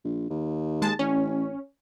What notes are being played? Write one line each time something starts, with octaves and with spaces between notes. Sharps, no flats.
A#1
D#2
G#3 A5
A1 C#4